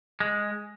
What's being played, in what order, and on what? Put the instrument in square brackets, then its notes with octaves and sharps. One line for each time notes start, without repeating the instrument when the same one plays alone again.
[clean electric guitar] G#3